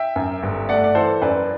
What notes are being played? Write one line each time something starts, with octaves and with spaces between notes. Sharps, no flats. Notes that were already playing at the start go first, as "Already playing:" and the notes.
Already playing: E5 G5
F#2
G1
A3 D5 F#5
D5
E3 A4 C5
F#2 B4 D5